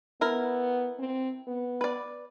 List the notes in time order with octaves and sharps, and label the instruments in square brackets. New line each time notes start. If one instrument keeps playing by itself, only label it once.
[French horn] B3 [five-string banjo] E4 A#4
[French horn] C4
B3
[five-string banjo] B4 D5